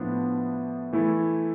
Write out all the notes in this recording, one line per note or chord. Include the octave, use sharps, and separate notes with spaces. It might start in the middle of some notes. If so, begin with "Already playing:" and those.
Already playing: A2 F3 B3 D4
E3 A3 E4 A4